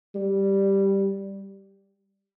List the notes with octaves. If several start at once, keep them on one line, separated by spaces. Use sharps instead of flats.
G3